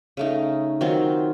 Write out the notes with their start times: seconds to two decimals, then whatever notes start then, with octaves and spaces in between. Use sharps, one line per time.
0.17 C#3 A3 D#4
0.81 D#3 F#3 C4 F4